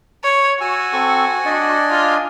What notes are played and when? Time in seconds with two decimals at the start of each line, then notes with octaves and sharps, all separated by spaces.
0.24 C#5
0.61 F#4 G#5 E6
0.93 C4 A4 C#6
1.45 D4 D5 D#5
1.89 F4